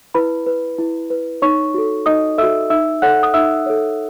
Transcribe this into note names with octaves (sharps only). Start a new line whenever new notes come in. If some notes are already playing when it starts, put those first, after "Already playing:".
E4 B4 B5
B4
E4
B4
D#4 C#5 C#6
F#4 A4
D#4 D#5 D#6
F#4 A4 E5 E6
D#4 E5 E6
A4 C#5 F#5 F#6
D#6
D#4 E5 E6
A4 C#5